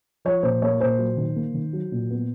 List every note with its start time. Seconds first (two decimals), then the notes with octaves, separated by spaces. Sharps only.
0.25 F3 C#5
0.43 A#2 C5
0.62 A#3 C#5
0.80 A#2 C5
0.98 F#3
1.17 D#3
1.35 A#3
1.54 D#3
1.73 F#3
1.92 A#2
2.10 B3